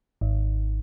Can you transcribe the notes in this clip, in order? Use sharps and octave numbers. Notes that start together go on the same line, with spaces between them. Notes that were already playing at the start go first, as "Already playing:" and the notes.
G#1